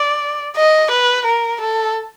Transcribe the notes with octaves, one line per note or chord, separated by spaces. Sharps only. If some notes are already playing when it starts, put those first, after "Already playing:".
Already playing: D5
D#5
B4
A#4
A4